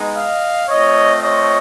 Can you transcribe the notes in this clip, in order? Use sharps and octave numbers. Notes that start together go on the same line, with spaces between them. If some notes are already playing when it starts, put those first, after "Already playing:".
Already playing: G#3 B3 D#4
D#5 F5
A3 C4 F4 C#5 D#5
C#5 D#5